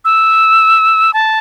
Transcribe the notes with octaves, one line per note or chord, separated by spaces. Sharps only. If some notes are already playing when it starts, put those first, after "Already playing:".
E6
A5